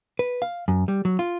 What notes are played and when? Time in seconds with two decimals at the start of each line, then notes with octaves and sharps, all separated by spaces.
0.19 B4
0.42 F5
0.68 F#2
0.88 G3
1.05 F#3
1.19 F4